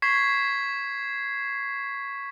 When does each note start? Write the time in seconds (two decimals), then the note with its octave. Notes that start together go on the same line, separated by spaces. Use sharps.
0.02 C#6 G#6 B6 C7